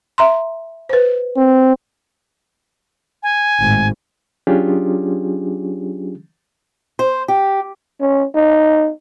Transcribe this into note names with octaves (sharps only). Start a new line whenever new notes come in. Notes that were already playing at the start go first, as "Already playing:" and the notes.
E5 A#5 C6
B4 C5
C4
G#5
G#1 A2
F#3 C#4 D4 F4 G4 G#4
C5
G4
C#4
D#4